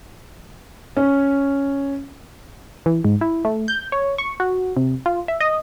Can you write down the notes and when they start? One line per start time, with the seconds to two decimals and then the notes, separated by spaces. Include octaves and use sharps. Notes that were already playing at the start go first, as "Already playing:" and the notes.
0.97 C#4
2.86 E3
3.05 G#2
3.21 E4
3.45 A3
3.68 G6
3.92 C#5
4.18 C#6
4.40 F#4
4.77 C3
5.06 F4
5.28 E5
5.40 D#5